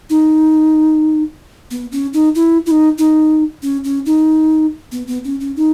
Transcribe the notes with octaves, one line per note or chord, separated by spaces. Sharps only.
D#4
B3
C#4
D#4
E4
E4
D#4
D#4
C#4
C#4
D#4
B3
B3
C#4
C#4
D#4